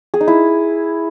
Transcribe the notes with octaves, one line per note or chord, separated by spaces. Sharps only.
G#4
D#4
E4